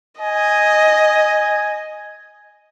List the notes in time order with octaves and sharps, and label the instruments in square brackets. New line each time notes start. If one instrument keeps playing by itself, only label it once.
[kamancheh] D#5 [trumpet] G#5